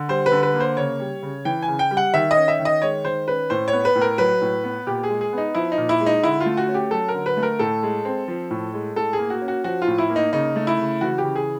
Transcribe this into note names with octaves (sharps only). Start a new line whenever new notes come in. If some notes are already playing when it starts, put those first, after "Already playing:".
Already playing: D3
G3 C5
B4
D3
B4
A#3
C5
C#3 C#5
G3
C#3
E3 G5
G#5
C#3
G5
G3
F#5
D#3 E5
D#5
C#4
E5
D#3
D#5
G#3 C#5
D#3 C5
C#4 B4
A2 C5
C#5
B3
B4
A2
A#4
F#3 B4
A2
B3
A#2 G4
G#4
G#3
G#4
B3 D#4
F3 E4
D#4
A#2
E4
G#3
D#4
D3 E4
F4
A3
F#4
C#4
G4
F#3 A4
A#4
D3
B4
A3
A#4
A2 A4
G#3
C4
F3
A2
G#3
A2 A4
G#4
A#3
F#4
C#4
F#4
F3 F#4
F4
A2
E4
A#3
D#4
C#3 D#4
A3
E4
C#3
E3 F#4
G4
C#3
G#4